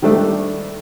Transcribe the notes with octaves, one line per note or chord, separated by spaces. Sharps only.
D#3 G3 A3 D4